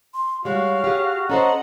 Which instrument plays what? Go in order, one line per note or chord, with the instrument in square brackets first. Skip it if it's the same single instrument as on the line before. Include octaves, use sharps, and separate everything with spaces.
[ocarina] C6
[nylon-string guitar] G3 G#3 [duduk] F#4 [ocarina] C#5 [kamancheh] F5
[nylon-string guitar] G4 G#4
[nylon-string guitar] C#4 A4 C5 [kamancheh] D#5 F#5 [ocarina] A#5